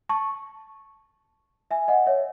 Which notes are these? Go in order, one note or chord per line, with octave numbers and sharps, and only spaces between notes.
A5 C#6
E5 G#5
D#5 F#5
C#5 E5